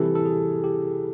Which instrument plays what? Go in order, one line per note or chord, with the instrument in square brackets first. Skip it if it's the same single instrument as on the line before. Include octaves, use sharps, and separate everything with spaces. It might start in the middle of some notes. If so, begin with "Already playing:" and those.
Already playing: [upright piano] C3 E3 G3 [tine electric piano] A4
[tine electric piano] A4
G#4
G4